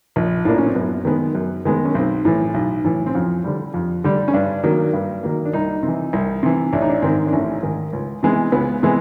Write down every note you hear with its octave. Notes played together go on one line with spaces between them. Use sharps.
A#1
A2 F3 A#3 D4
C#4
C4
F#2 B3
D#3 G#3 B3
F#2
D#3 G#3 B3
C#4
B1 C4
A2 E3
B1
A2 E3
C4
F2 C#4
D3 G3
F2
D3 G3
C#4
G2 D4
D#3 F#3 A#3
G2
D#3 F#3 A#3
D4
C2 D#4
C3
E3
C2
C3 E3
A1 D4
D#4
D4
G#2 D#3 C4
D4
A1 C#4
G#2 D#3
C#2
C3 E3 G#3 B3
C#2 B3
C3 E3 G#3 B3